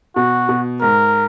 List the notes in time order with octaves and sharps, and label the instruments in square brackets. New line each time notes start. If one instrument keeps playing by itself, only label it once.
[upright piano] B2 [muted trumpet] F#4
[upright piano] B2
[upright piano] G#2 [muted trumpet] A#4